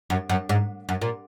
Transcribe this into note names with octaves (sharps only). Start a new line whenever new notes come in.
F#2
F#2
G#2
F#2
A#2